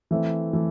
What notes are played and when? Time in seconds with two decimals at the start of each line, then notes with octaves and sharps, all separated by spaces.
0.11 E3 A3 C4
0.53 E3 A3